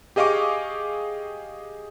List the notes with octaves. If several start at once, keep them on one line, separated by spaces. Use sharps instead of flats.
G4 G#4 D#5 F5 C#6 D6